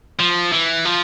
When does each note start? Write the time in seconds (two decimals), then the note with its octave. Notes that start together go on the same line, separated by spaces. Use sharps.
0.19 F3
0.52 E3
0.85 F3